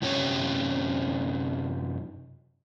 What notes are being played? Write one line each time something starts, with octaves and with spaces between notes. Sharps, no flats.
F#2 C3 C#4 G4 C#5